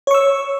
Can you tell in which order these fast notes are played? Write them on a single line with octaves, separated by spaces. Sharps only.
C#5 C#6 E6